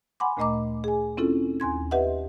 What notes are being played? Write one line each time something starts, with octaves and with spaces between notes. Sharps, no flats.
F#5 G#5 B5 C6 D6
D2 A#2 A3 D#5 A#5 D6
G#4 G#5
C4 C#4 E4 F4 A4
D#2 G#5 C6 G#6
G4 B4 D#5 E5 F#5